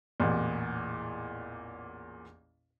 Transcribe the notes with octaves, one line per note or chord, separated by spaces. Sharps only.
A1 E2 A#2